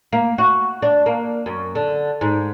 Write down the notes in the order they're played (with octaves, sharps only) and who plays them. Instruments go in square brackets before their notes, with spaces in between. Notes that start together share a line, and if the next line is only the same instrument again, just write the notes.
[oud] A#3
F#4
D4
A#3
F#2
D3
G#2